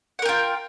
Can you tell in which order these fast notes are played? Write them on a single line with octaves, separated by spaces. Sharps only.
F#5 A#4 G5 F4